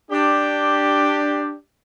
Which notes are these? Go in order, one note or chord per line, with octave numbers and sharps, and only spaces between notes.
D4 G4